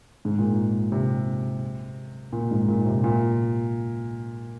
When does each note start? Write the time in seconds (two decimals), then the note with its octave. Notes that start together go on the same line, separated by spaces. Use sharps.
0.25 G#2
0.39 A#2
0.92 C3
2.33 A#2
2.51 G#2
2.68 A#2
2.86 C3
3.04 A#2